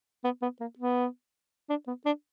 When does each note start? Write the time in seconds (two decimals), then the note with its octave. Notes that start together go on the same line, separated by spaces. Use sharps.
0.24 B3
0.42 B3
0.61 A#3
0.79 B3
1.70 D4
1.87 B3
2.06 D4